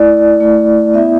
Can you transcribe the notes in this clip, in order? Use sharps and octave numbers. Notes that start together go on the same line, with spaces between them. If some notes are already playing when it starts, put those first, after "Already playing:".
Already playing: A3 E4 D5
A3 E4
B3 E4 E5